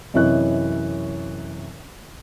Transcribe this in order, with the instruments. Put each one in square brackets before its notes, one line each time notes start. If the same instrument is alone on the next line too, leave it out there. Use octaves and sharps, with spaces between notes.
[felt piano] F#2 C3 E3 C#5 D#5 F#6